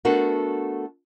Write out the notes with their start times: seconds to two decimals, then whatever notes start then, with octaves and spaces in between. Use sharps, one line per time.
0.05 A3 B3 D4 F#4 A4 A#4